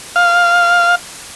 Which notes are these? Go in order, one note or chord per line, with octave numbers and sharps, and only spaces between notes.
F5